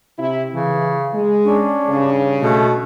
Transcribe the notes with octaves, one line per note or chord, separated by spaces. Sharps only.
C3 E4
C#3 E3
G#3
C#4 D4
G2 C#3
B2 A3